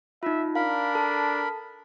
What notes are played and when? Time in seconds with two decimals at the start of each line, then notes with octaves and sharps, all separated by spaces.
0.23 D#4 F4 E5
0.55 D4 A#4 F5 B5
0.94 A4 A5